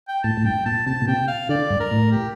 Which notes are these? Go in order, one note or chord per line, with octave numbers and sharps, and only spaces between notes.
G5
A2 A5
A2
G2 G5
A#2 A5
C3 A5
A#2
C3 G5
F5
D3 D5
G2
A#4
A2
G4